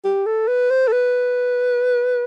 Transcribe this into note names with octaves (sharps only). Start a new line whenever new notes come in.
G4
A4
B4
C5
A4
B4